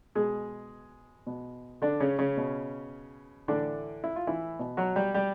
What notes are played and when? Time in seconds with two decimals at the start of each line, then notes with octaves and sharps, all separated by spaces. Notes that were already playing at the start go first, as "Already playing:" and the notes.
0.15 B2 G#3 G#4
1.27 B2
1.82 D3 D4
2.00 C#3 C#4
2.19 C#3 C#4
2.37 B2
3.48 A2 D3 E3 D4
4.04 E4
4.16 F4
4.27 E3 E4
4.59 B2
4.77 F#3 F#4
4.96 G3 G4
5.14 G3 G4